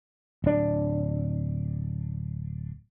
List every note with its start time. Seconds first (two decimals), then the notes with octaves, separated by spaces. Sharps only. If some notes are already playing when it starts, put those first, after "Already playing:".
0.44 D1 D4